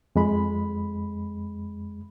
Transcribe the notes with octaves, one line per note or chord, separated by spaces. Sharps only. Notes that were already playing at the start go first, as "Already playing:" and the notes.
F2 G#3 B5